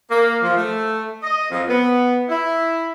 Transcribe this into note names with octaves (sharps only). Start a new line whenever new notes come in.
A#3
F3
A3
D#5
F2
B3
E4